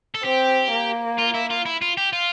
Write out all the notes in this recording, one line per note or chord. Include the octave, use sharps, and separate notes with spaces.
A4
C4 G4
A#3
F4
E4
F4
E4
F4
G4
F4